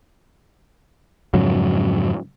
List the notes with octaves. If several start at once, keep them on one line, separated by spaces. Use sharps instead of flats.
F2 G#2 C#3 F#3